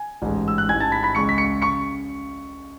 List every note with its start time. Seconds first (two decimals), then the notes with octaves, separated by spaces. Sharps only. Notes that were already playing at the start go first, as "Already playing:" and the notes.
Already playing: G#5
0.22 A1 G#2 G#3
0.48 E6
0.58 F#6
0.69 A1 G#2 E3 G#5 G#6
0.80 A5 A6
0.92 B5 B6
1.03 B5 B6
1.15 C#2 C#3 G#3 C#6 C#7
1.29 B6
1.38 C#6 C#7
1.62 C#3 C#6 C#7